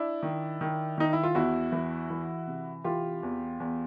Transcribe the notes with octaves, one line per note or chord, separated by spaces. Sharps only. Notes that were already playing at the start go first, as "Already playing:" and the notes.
Already playing: D4 E4
D#3
D#3
D#3 D#4
E4
F4
E2 E4 F#4
E3
E3
C3
E3 F4 G4
E2
E2